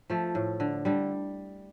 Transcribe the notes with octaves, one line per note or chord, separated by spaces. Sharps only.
F3 A3
A2
D3
D3 G3